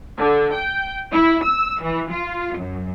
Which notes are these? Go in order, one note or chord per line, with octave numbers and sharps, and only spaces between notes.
D3
G5
E4
E6
E3
F4
F#2